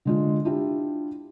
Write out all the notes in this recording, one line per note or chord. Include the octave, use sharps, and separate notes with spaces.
D3 G#3 F4
D4 E4 F4 G4